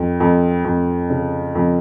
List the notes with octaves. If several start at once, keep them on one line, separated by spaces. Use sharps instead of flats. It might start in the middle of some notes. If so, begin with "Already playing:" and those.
Already playing: F2
F2
F2
C#3
F2